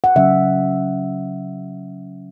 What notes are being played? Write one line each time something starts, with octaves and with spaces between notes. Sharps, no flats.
F#5
C#3 F#3 C#4 E5